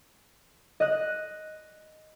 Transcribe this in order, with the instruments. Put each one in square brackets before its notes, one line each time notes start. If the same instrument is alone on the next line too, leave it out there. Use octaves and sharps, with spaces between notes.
[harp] D#5 F#6